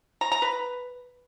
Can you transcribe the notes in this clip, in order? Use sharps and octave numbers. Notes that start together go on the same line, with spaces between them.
A#5
A#5
B4